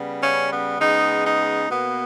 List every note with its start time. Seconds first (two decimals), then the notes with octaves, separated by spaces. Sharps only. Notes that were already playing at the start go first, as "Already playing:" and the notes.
Already playing: C#3 G3 B3
0.21 C#4
0.50 B3
0.80 C#3 G#3 B3 D#4
1.24 D#4
1.68 B2 A#3 B3